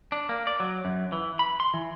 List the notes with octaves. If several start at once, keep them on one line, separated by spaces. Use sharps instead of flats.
D4
A#3
D5
F#3
F#2
E3
B5
C6
E3